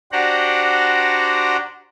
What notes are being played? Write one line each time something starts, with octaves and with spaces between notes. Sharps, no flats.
D4 F#4 G4 C5 F#5 A#5